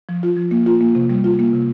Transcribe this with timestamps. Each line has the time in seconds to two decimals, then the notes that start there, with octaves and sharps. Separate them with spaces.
0.09 F3
0.23 F4
0.37 F3
0.51 A#3
0.66 F4
0.81 A#3
0.95 C3
1.10 G3
1.24 F4
1.39 A#3
1.53 C3